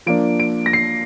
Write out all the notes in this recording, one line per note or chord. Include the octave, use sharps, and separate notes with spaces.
F3 A#3 D4 D7
D7
A#6
C7